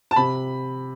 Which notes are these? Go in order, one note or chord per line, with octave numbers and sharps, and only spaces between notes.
A5
C3 B5